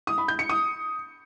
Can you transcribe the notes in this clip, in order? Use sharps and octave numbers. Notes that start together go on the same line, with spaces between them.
D#6
B5
G6
C#7
D#6